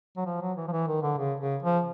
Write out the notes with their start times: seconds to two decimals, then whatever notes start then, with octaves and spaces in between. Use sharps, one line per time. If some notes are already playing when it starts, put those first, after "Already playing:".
0.17 F#3
0.26 F3
0.41 F#3
0.57 E3
0.68 F3
0.72 E3
0.88 D#3
1.02 D3
1.18 C#3
1.40 C#3
1.63 F3